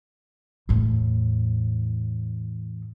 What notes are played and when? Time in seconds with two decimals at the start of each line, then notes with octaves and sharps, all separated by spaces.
0.69 E2 A2